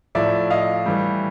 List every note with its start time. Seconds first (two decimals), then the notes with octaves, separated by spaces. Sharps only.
0.15 A2 F3 D5 E5
0.50 D#5 F5
0.86 A2 E3 G3